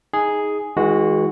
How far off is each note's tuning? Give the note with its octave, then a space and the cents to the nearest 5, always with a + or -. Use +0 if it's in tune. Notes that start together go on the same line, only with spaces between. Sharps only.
D#4 +20 G#4 +0
E3 -40 G#3 +0 F#4 +0